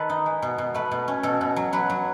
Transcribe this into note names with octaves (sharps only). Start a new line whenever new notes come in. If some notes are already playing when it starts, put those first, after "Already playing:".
Already playing: D#3 A4 B4
D#4
G#3
B2
B2
A3 B4
B2
C#4
B2 A4
B2
F#3
F#3 B4
F#3